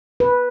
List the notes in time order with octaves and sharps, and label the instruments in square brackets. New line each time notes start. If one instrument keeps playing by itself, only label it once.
[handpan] B4